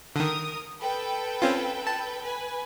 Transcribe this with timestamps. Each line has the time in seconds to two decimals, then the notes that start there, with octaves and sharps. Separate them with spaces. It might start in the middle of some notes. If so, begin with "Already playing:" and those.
0.16 D3 D#3 A#4 D#6
0.80 A4 B4 G5
1.42 C4 C#4 F4
1.87 A5
2.23 B4 G#5